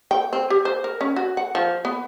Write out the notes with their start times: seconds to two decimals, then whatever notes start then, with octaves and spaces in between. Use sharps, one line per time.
0.11 G5
0.33 C4
0.50 G4
0.65 C5
0.84 A#4
1.01 C#4
1.16 F#4
1.37 F#5
1.55 F3
1.85 B3